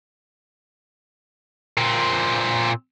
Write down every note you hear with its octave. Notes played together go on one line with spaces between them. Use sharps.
A#2 C4